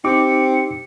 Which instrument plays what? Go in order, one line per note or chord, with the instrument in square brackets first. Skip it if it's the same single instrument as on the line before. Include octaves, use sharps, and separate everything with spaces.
[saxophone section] C4 [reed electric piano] D#4 D6 [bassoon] G4 [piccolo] C#7